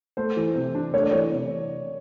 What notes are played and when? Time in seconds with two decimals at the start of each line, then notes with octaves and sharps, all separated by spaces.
0.17 A3 C5
0.37 E3
0.55 C3
0.75 D4
0.94 A3 C#5
1.03 D5
1.11 E3 C#5
1.32 C3